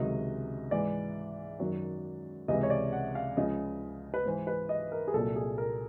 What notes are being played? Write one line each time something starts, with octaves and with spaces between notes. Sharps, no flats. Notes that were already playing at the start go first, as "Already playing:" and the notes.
Already playing: C#2 C3 D#3 F#3 D#5
G#2 E3 D5
F#2 D#3 F#3
C#2 C3 E3 D#5
C#5
D5
F#5
F5
C#2 C#3 F3 D#5
B4
G#2 E3 C5
B4
D#5
A#4
G#4
C2 A#2 F#3 A4
G#4
A#4